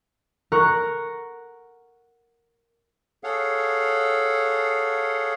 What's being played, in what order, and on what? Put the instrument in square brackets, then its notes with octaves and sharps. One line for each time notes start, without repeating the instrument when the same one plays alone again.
[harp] A#4 F#5 A#5 C#6 F#6
[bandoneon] G#4 A4 C#5 F5 F#5